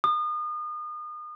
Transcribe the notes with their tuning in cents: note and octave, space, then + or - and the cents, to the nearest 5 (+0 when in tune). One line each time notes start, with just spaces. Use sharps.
D#6 -35